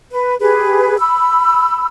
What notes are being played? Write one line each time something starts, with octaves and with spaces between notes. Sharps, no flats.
B4
G4 G#4 B4
B5 E6